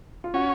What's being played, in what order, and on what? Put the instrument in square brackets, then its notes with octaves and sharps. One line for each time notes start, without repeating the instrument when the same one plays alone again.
[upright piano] F4
[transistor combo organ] C#4 [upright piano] F#4